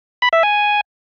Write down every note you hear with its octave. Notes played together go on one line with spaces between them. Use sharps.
B5
E5
G#5